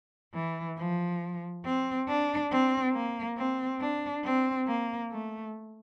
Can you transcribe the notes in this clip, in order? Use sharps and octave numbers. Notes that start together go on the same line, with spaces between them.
E3
F3
C4
D4
C4
A#3
C4
D4
C4
A#3
A3